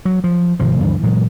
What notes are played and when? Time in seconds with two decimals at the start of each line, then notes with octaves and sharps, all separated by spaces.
0.05 F#3
0.24 F3
0.60 G#1 C3 F3
0.80 D2 G2 E3 F3
1.03 A#2 E3 F#3 G#3